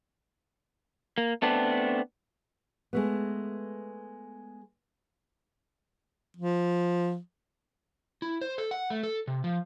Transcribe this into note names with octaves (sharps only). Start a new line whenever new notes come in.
A#3
A3 B3 C4 D4
G#3 A3 B3
F3
E4
C5
A4
F#5
A3
A4
C3
F3